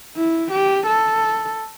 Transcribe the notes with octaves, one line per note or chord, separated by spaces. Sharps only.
E4
G4
A4